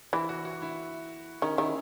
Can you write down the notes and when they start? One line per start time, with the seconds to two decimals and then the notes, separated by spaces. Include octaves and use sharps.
0.13 E3 E4
0.29 F#4
0.45 F#4
0.62 E4
1.42 D#3 C#4
1.57 D#3 E4